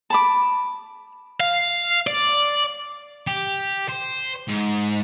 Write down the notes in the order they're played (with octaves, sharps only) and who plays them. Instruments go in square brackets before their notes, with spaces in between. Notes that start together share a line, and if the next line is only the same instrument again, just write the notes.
[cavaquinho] A5 B5 D6
[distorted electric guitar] F5
D5
G4
C5
G#2